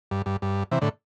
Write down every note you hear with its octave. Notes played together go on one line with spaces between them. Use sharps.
G2
G2
G2
C3 E3
A2 D3